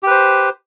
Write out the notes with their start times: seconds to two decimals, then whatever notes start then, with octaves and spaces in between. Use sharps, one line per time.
0.03 G4
0.07 B4
0.11 C5